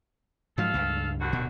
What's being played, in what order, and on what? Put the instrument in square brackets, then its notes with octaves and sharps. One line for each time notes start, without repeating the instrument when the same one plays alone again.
[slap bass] G#2 F3 F#3 [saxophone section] A4 F5
[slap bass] C#2 G2
[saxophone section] D#2 D3 F#4
[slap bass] D1 B2